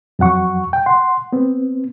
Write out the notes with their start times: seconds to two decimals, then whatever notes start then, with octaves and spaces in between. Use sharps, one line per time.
0.19 F2 F#3 F#5 C#6
0.73 G5
0.86 F#5 C6
1.33 B3 C4